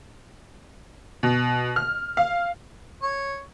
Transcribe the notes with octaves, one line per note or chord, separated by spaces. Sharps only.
B2
F6
F5
C#5